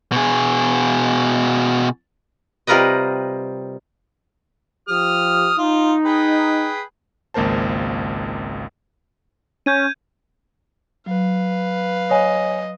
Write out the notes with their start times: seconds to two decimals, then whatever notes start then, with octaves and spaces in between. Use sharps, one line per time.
0.12 B2 G#4
2.67 C3 G3 F4 A#4 B4 D#5
4.88 F3 G4 D#6 F6
5.58 D#4 F4
6.05 G#4 B4 G5
7.34 G#1 C#2 A#3 A#4 C5 A5
9.66 C#4 G6 G#6 D#7
11.06 F#3 B4 F5
12.11 C#5 D#5 G#5